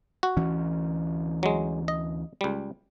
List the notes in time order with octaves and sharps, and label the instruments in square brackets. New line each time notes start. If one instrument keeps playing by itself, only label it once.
[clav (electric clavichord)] F#4
[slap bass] D2 E3 C#4
[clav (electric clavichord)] F#3 G#3
D#5
C#2 G3